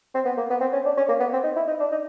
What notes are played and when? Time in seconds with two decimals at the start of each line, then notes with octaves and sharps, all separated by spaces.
0.14 C4
0.25 B3
0.37 A#3
0.50 B3
0.61 C4
0.73 C#4
0.85 D4
0.97 C#4
1.09 A#3
1.20 B3
1.33 C4
1.43 D#4
1.56 E4
1.67 D#4
1.80 D4
1.92 D#4